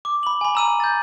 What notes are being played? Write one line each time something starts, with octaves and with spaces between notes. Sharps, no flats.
D6
B5 F#7
G#5 B5
A#5 E6 D#7
G6 A6